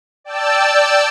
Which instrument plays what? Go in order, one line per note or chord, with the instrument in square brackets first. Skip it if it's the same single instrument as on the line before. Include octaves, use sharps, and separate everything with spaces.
[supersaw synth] D5 G5 A5 E6